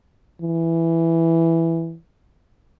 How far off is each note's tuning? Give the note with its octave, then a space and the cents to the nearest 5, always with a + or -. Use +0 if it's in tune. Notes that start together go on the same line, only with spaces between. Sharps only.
E3 +5